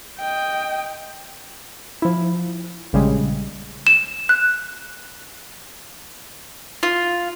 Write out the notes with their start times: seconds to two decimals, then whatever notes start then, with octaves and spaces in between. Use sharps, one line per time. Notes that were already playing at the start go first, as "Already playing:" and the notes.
0.19 D#5 G5
2.02 F3 E4
2.93 A#1 C#3 G3 G#3
3.87 E7
4.29 F#6
6.83 F4